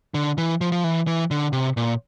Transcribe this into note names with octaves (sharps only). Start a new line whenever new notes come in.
D3
E3
F3
F3
E3
E3
D3
C3
A#2